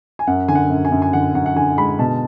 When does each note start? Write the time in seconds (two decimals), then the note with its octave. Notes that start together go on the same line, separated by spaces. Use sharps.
0.19 G#5
0.27 F#2 F#5
0.48 D3 G#5
0.55 F#5
0.70 F#2
0.85 G#5
0.92 F#2
1.02 G#5
1.13 D3 F#5
1.34 F#2 F#5
1.46 F#5
1.56 D3 G#5
1.78 G#3 B5
1.99 B2 A5